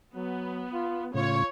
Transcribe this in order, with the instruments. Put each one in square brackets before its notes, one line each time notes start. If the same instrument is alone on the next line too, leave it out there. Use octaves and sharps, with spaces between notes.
[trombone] F#3 [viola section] B3
[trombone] F4
[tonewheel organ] A2 C#3 [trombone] F4 [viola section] C#5